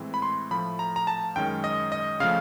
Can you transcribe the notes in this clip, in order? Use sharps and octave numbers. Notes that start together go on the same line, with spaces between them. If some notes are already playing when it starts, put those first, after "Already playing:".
Already playing: A2 E3 G#3 C4
B5
C6
A2 F3 A3 B5
A#5
A#5
A5
F#2 D#3 G#3 C#4 G5
D#5
D#5
C#3 F3 A3 F5